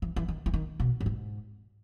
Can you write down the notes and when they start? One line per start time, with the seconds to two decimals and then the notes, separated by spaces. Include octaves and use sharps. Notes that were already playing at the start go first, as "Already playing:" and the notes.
0.02 E3
0.16 E3
0.28 D#3
0.46 E3
0.54 D#3
0.80 B2
1.01 A2
1.06 G#2